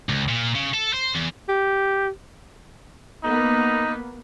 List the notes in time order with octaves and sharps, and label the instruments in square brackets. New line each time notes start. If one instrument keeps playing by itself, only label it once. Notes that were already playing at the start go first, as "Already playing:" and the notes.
[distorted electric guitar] C#2
A#2
C#3
A4
C5
E2
[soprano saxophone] G4
[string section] A#3 B3 [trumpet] D#4